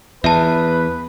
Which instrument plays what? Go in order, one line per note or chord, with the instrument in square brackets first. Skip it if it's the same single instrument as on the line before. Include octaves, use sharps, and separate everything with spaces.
[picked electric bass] E2 [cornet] B4 [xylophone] E5 A5